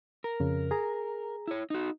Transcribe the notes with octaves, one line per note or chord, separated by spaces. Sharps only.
A#4
F2 C#3
G#4 A#5
E4 C#5
D#4 F#4